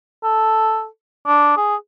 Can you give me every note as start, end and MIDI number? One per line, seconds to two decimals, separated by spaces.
0.24 0.86 69
1.27 1.56 62
1.57 1.75 68